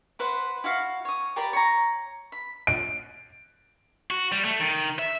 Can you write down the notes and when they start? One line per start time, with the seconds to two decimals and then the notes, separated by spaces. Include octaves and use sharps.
0.19 E4 B4 C5 F#5
0.64 E4 F#4 F5
1.05 C#5 D#6
1.36 G4 A#4 D5 B5
1.53 C#5 A#5
2.32 B5
2.67 D7
4.11 F#4
4.32 G3
4.45 A3
4.60 D#3
4.99 E5